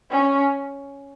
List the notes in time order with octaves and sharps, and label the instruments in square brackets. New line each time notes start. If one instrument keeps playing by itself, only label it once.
[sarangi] C#4